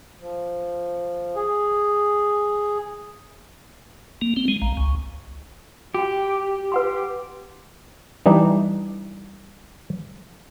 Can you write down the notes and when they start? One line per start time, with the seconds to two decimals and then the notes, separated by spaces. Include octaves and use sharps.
0.21 F3
1.36 G#4
4.22 A#3
4.37 C4
4.48 G#3
4.62 A#1
4.77 C#2
5.94 F#4 G4 G5
6.72 B4 F#5 C6
8.26 E3 G3 D4 D#4